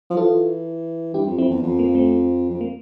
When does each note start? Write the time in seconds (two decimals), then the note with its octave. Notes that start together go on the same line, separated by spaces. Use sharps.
0.10 F3
0.17 E3 F4 A4
1.14 G2 E4 G4
1.26 F2
1.38 F2 C4 E4
1.50 E2
1.63 F2
1.79 A#3
1.95 A3 C4
2.50 F2
2.61 A#3